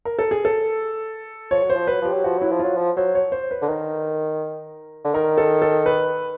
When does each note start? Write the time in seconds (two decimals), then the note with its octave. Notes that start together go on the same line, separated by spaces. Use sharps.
0.05 A#4
0.19 A4
0.31 G#4
0.45 A4
1.51 F3 C#5
1.63 F#3
1.70 C5
1.76 F3
1.87 F#3 B4
2.02 F3 G4
2.14 F#3
2.24 F3 F#4
2.39 F#3 E4
2.52 F3
2.59 F#3 F4
2.77 F3
2.97 F#3 C5
3.15 C#5
3.32 C5
3.51 B4
3.62 D3
3.68 D#3 A#4
5.04 D3
5.14 D#3 A#4
5.38 A4
5.62 A4
5.86 B4